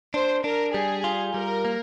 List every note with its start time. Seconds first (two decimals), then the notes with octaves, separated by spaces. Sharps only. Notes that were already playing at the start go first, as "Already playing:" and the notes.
0.14 D4 C5
0.44 D4 A#4
0.74 G3 G#4
1.04 F4
1.34 G3 A#4
1.65 A#3